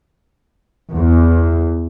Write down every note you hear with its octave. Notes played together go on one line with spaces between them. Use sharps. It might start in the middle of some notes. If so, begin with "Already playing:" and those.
E2